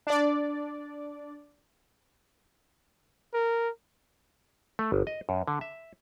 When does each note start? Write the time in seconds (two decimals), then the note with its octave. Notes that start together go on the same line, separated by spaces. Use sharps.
0.07 D4 D5
3.34 A#4
4.79 A3
4.92 G1
5.07 D#5
5.29 F#2
5.48 D3
5.61 E5